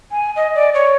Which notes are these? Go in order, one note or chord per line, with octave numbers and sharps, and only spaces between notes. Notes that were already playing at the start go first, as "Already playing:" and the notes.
G#5
D#5
D5
C#5